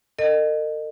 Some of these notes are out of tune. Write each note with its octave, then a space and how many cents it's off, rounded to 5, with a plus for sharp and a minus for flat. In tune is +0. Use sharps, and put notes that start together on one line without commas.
A#4 -45 D#5 -25